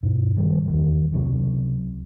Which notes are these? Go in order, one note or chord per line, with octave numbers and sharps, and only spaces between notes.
G2 B2
D#3 F3 G3
E2 A#2 D#3 E3
C#2 C3 F#3